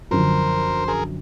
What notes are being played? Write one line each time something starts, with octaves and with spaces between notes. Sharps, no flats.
F#2 D3 F3 A#4 C5
G#4 A#4